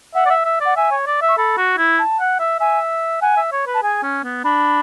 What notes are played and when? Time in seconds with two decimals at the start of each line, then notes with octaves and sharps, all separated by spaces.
0.15 E5 F#5
0.26 D5
0.30 E5
0.45 E5
0.61 D5 F#5
0.76 E5 G#5
0.91 C#5
1.07 D5
1.22 E5
1.28 C#6
1.37 A4 B5
1.57 F#4
1.78 E4
1.99 A5
2.20 F#5
2.39 E5
2.60 E5 G#5
3.22 F#5 G#5
3.37 E5
3.52 C#5
3.67 B4
3.74 A5
3.83 G#4 G#5
4.03 C#4
4.24 B3
4.44 D4 B5